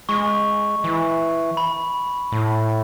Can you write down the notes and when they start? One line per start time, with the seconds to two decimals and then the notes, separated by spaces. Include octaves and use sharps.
0.09 G#3 C#6
0.84 E3
1.57 B5
2.32 A2